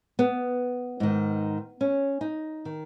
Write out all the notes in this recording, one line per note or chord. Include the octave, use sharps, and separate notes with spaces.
B3
G#2 D#3
C#4
D#4
D#3